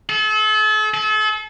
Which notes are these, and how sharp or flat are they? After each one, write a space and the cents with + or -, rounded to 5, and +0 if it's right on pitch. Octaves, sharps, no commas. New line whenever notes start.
A4 -40
A4 -40